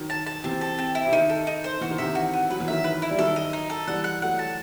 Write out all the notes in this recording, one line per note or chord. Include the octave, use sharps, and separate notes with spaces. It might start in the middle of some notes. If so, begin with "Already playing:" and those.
Already playing: D#3 F#3
A5
A5
C3 E3 C4
A4
C4
E4
C3
D#3 D#4
A4
D#4
C5
E3 F#4
D#3
C3 E3 E5
F#4
B3
F#3 B4
E3
D#3 F#3 E5
B4
E4
G3
D#3 F#3 A4
D#5
D#4
A4
E3 G3 F#5
F#5
F#3 A3 F#5
A5